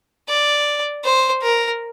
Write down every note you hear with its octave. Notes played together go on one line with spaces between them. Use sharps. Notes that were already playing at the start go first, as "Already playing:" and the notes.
D5
C5
A#4